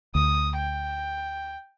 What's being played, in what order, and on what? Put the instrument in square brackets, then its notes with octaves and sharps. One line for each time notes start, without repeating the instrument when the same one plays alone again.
[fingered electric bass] D2 [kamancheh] D#6
[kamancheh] G5